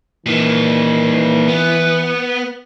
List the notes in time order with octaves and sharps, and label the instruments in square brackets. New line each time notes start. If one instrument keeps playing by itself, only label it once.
[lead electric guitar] A#2 D#3 [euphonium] E3
[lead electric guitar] B3